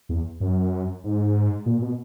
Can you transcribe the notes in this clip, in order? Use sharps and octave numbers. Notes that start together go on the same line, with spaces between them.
E2
F#2
G#2
A#2
B2